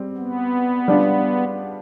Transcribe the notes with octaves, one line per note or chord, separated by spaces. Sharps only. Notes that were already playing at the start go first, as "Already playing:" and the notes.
Already playing: G3 C4
B3
G3 D4 F4